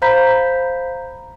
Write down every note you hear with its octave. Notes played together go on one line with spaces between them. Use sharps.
C5 F5 A#5 B5 G6 B6